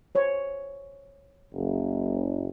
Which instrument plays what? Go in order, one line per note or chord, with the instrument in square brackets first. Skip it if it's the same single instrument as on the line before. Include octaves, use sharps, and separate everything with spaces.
[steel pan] C5 C#5
[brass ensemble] F#1